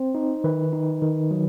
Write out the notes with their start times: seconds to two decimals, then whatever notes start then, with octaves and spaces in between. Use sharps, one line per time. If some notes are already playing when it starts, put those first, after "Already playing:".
Already playing: C4 C5
0.15 D#4
0.44 D#3 B4
0.73 D#4
1.02 D#3
1.31 F#3